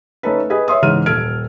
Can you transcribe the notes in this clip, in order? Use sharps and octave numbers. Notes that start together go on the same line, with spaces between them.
A3 C#4 D#4 A4 B4
G4 G#4 B4 D#5 G#5
C#5 E5 C6 D#6
G#2 C#3 E3 F6 D#7
D#1 A4 F6 G#6 D7